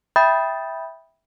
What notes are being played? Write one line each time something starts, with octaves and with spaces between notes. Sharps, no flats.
E5 G5 B5 D#6 G6 A6